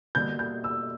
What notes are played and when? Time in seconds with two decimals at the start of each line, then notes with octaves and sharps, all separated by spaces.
0.15 B2 G3 A#3 G6
0.39 G6
0.64 E6